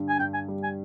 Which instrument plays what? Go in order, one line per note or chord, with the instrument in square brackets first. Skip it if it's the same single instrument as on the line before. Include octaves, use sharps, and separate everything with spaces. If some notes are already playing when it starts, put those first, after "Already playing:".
Already playing: [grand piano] G2 D3
[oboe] G#5
[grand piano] G2 [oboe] G5
[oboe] G#5
[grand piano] G3
[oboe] G#5